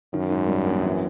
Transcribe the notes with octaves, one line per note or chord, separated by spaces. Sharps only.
F#2 D#3
G#2
G3
A#1
E3